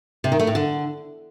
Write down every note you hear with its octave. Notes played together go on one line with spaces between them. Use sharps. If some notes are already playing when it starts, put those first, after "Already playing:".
C3
D#3
A3
A2
D3